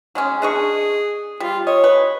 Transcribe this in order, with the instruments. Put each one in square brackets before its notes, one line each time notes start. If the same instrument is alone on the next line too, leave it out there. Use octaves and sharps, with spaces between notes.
[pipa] F#3 G#3 C#4
[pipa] D4 D#5 C#6 [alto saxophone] G#4
[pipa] G3 [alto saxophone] F4
[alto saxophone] C#5 [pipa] D#5
[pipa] B4